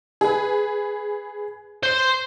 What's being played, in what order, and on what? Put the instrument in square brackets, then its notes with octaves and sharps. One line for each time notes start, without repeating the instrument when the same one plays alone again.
[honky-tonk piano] G#4 B4
[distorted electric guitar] C5 C6